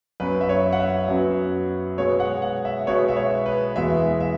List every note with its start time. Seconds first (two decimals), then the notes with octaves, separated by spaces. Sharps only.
0.20 F#2 F#3 B3 B4
0.41 E5
0.49 C#5
0.72 F#5
0.79 E5
1.09 F#2 F#3 B3
1.98 B2 G#3 B3 C#5
2.20 F#5
2.42 F#5
2.65 E5
2.87 B2 G#3 B3 C#5
3.08 E5
3.16 C#5
3.46 B4
3.76 E2 B2 G#3 B3 E5
4.20 E5